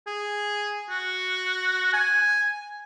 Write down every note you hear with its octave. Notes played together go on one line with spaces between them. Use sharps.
G#4
F#4
G#5